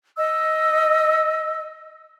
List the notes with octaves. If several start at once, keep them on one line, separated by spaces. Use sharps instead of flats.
D#5 E6